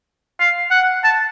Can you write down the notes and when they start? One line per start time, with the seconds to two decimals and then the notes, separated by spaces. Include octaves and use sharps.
0.39 F5
0.71 F#5
1.04 A5